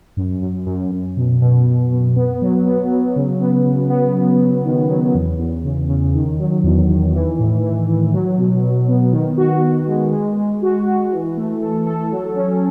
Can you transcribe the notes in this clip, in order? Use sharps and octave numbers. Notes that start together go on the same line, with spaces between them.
F#2
F#2
F#2
F#2
B2
B2
B2
B2
B3
F#3
B3
F#3
C#3
B3
C#3
B3
F#3
F#3
D#3
F#3
E2
E2
C#3
C#3
D#3
F#3
E2
D#3
E3
A2
E3
E3
F#3
B2
B2
B3
D#3
F#4
F#4
G#3
G#3
G#3
F#4
F#4
E3
A3
A4
A4
F#3
C#4